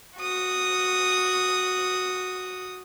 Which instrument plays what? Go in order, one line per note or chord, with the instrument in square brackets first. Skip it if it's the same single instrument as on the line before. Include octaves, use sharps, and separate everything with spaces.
[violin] F#4 D#6